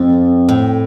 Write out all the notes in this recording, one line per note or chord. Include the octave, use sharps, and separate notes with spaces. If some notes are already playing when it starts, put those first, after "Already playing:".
Already playing: F2
A2